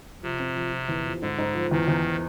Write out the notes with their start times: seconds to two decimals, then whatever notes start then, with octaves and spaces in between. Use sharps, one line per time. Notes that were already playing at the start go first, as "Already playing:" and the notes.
0.23 C3 F3
0.39 C4
0.56 F3
0.72 F3
0.89 E2
1.05 F3
1.21 G#2 D3
1.38 G#2
1.54 F3
1.71 E2 D#3
1.88 E2